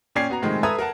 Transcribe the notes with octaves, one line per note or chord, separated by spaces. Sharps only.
A#2 C#4 D5 G5 G#6 C7
B3 F#4 A#5
A2 C3 D#3 F3 G#3
A4 B4 E5 A#5 D#6 G#6
A#4 F#5 A5